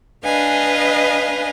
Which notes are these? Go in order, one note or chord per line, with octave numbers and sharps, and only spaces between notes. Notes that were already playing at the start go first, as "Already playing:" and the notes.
D4 B4 D#5 F5 G#5